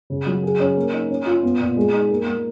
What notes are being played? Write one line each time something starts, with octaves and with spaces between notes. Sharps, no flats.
C#3
F#3
G#4
C#4
A#3
D#4
C#4
F4
B3
A#2
G#3
D#4
A#3
A#3